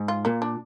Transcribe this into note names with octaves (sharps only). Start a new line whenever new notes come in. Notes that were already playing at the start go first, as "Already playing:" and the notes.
Already playing: G#2
F4
A#2 A#3
D4